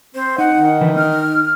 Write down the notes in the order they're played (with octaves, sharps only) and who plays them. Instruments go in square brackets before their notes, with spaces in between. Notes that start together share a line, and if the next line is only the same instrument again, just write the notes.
[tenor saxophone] C4 [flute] C5
[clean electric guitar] D#4 [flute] F#5
[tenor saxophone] D#3
[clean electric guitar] D3 E3 B4
[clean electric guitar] D#4 [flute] F6